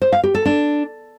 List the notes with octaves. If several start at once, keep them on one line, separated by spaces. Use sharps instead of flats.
C5
F5
G4
A4
D4